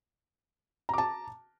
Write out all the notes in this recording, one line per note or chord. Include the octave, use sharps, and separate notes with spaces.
A5 A#5 D6